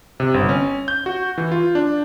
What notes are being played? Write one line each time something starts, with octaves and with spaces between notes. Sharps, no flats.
C3
G1
C#4
G6
F#4
E3
F4
D4